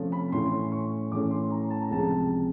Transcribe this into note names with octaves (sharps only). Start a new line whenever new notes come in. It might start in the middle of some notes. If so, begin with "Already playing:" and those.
Already playing: C3 F3 A3 C#4
B5
A2 E3 A3 C#4 C6
C6
C#6
A2 E3 A3 C#4 D6
C6
A#5
A5
A#5
C#2 C3 F3 G#3 A5